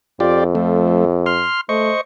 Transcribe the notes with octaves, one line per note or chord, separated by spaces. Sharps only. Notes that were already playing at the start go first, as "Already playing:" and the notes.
F2 F4 G4 D5
F3 A3
C6 F6
A3 C5 D#5 C#6